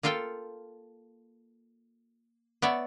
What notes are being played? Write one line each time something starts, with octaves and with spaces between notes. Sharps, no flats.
A#3 F4 A4 F5 G5
B3 C#5 D5 E5